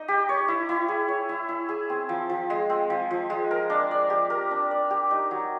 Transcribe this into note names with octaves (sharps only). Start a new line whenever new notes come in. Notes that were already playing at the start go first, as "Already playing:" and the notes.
Already playing: D#4 D#5
G4
C#5
E4
E4
G#4
C#5
E4
E4
G#4
C4
F3
F3
G#3
C4
F3
F3
G#3
A#4
D4
D5
G4
A#4
D4
D5
G4
D#4
F#3